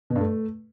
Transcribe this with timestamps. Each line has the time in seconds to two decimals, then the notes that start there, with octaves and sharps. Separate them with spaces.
0.10 B2
0.15 G2
0.21 A3